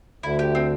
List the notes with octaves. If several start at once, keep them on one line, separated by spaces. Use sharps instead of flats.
D2 D3 E4
G4
C4